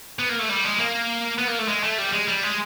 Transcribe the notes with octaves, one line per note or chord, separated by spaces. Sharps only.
B3
A#3
A3
G3
G#3
A#3
B3
A#3
A3
G#3
A3
G3
G#3
G3
G#3